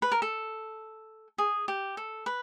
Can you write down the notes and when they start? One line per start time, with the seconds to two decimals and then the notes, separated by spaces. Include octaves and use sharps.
0.02 B4
0.12 A#4
0.22 A4
1.38 G#4
1.68 G4
1.97 A4
2.26 B4